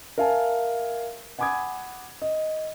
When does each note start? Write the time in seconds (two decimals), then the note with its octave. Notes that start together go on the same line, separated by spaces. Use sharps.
0.18 A#4 E5 F5 G#5 A5
1.39 F#5 G#5 B5 D6 D#6 G#6
2.22 D#5